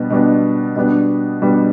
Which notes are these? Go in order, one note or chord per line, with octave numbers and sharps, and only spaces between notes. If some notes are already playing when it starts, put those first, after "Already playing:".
Already playing: B2 G3 B3 D4
B2 G3 B3 D4
B2 G3 B3 D4
B2 G3 B3 D4